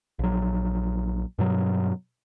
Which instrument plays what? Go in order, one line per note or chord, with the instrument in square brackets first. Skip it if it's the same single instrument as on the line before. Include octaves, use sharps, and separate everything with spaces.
[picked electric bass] A#1 F#3
G2 B2 F#3